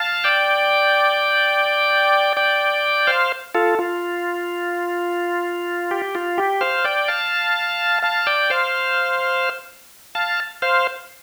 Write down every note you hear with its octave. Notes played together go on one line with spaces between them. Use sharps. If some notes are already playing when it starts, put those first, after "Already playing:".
Already playing: F5 A5
D5 G5
D5 G5
C5 F5
F4 A4
F4
G4
F4
G4
C5 F5
D5 G5
F5 A5
F5 A5
D5 G5
C5 F5
F5 A5
C5 F5